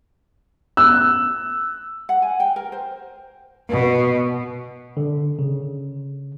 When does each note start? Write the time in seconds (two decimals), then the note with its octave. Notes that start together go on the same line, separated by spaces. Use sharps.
0.77 E6 F#6
2.09 F#5
2.22 G#5
2.40 G5
2.56 A#4
2.72 C5
3.68 B2
4.97 D3
5.39 C#3